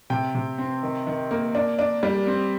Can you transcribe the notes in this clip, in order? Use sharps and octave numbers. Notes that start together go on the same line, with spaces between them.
C3 G5
C3
C4
D#3
D#3
A#3
D4
D4
G3
C4